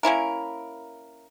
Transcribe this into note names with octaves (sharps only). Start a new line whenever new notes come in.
A#3 C#4 E4 A#4